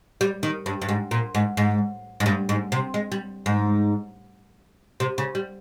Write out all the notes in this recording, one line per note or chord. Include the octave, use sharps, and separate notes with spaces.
G3
D#3
G2
G2
G#2
A#2
G#2
G#2
G#2
G2
G#2
C3
G#3
G3
G#2
C3
C#3
G3